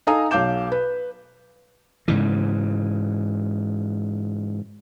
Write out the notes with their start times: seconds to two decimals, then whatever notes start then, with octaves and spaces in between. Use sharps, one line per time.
0.07 D#4 A4 F5 G#5 A#5 D#6
0.31 B1 F5 D6 G6 E7
0.72 B4
2.08 G#2 C#3 E3